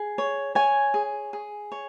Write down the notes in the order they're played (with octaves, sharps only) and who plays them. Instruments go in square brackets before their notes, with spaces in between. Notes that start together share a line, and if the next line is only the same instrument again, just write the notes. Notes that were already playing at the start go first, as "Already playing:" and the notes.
Already playing: [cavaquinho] G#4
C#5
C#5 G#5
G#4
G#4
C#5